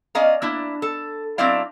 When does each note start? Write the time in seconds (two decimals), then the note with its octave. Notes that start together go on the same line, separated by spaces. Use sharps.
0.15 C#4 D5 D#5 F5 A#5
0.42 A#3 D4 E4
0.82 A4
1.38 F#3 C4 D4 E4 D5 F5